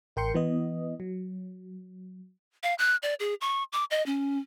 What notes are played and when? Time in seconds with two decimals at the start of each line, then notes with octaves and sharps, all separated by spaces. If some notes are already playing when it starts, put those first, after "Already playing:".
0.16 A1 A#4 G5 C6 C#7
0.34 E3 B3 D#5
1.00 F#3
2.63 F5
2.79 F#6
3.03 D5
3.20 G#4
3.41 C#6
3.73 D6
3.91 D#5
4.06 C#4